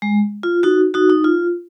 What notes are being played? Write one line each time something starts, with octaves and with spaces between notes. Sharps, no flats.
G#3
F4
D#4 F#4
D#4 F#4
D#4
F4